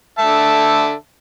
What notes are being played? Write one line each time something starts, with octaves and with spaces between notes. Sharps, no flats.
D3 E5 A5